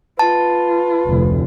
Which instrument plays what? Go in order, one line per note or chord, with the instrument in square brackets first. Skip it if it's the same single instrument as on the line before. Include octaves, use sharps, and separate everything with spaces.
[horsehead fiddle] F4 [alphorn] B4 [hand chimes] A5
[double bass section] F1 D2